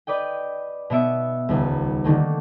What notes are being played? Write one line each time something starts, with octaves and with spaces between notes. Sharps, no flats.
B4 D5 D#5 G5
B2 B3 E5 D7
D#1 C#2 B3
D3 D#3 A3 A#3